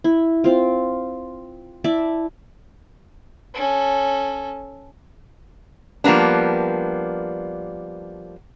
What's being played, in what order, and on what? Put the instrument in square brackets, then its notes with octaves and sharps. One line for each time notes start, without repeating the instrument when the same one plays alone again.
[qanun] E4
C4 F4
E4 D5 E5 A5
[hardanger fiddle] C#4 A4
[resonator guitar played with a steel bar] F3 G3 A#3 B3 D4